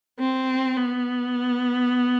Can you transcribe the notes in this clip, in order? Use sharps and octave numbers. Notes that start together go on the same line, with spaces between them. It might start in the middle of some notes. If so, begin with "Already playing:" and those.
C4
B3